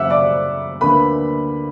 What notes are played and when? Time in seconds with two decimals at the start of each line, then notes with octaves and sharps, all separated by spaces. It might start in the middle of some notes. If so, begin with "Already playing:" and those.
Already playing: F#2 C#3 F#3 E5 F#5 D6 E6 F#6
0.10 D5 D6
0.81 D2 D3 A#3 B4 B5